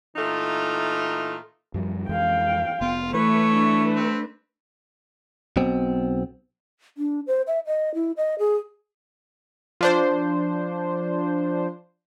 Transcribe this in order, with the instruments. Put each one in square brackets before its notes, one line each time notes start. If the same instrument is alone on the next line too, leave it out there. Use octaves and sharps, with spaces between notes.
[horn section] A#2 E3 A3 D#4 F4
[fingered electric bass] F#2 F3 G3
[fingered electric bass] F2 E3 G#3 [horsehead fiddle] F5 G5
[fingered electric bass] F1 B3 [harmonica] F4
[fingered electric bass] E3 [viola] A3 [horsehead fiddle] B4 [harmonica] C#5
[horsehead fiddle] D4 B4
[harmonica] C4
[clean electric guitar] B1 B2 C4
[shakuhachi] D4
C5
E5
D#5
E4
D#5
G#4
[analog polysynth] F3 D4 C5